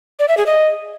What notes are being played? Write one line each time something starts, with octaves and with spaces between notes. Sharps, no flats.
D5
E5
G#4
D#5